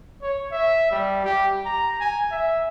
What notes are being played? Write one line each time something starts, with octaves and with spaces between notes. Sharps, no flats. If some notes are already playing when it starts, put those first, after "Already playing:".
C#5
E5
G3
G4
A#5
G#5
E5